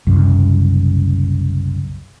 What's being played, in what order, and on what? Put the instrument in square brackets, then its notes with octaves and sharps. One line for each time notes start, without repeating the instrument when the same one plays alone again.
[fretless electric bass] F#1 C2 F#2